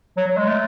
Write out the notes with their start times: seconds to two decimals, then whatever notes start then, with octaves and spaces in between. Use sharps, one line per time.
0.17 F#3
0.27 F#3
0.37 G#3
0.48 A3